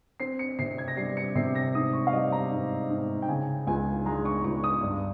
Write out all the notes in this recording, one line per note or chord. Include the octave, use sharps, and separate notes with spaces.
C4 C7
C#7
C3 C7
G#6
A#6
G3 C7
C#7
C3 C7
A#6
G#2 D#6
C#6
F5
G3 D#5
A#5
G#2
G#2
G5
C#3 G#5
C#2 G#5
G#3 A#5
C#6
C#2 C#6
D#6
G2